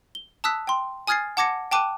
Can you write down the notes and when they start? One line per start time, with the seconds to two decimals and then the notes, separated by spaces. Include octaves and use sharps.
0.15 G7
0.44 A5 D#6 E6 F#6 B6
0.67 G5 C6
1.07 G#5 D#6 F6 G#6 A6 C7
1.37 F#5 A5 D6 G#6 A#6 C#7
1.71 G5 A5 D6 F#6 D#7